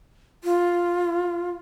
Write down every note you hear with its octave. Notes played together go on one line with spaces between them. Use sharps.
F4